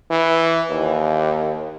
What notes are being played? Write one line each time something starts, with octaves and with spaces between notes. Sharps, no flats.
E3
D#2